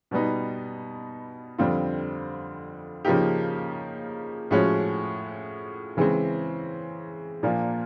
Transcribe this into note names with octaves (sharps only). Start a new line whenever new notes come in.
B2 G3 B3 D#4
F2 D3 G3 C4 F4
C#3 F3 A#3 D#4 G4
A2 F3 G#3 C#4 F#4
C#3 E3 G#3 C4
A#2 F3 A#3 D4 F4